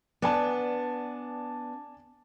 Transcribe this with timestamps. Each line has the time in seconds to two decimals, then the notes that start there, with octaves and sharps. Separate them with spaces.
0.22 B3 D4 D5 G#5 A5